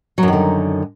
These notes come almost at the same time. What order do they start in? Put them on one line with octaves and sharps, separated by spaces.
F#3 F#2 D#3 D3